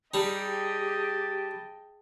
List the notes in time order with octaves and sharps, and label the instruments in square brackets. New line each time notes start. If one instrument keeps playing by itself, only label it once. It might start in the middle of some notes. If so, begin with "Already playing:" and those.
[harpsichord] G3 D#4 [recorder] G4 [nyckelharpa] G#4 D#5 [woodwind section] G5 A5